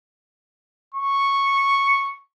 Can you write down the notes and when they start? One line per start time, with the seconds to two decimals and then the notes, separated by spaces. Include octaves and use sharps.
0.95 C#6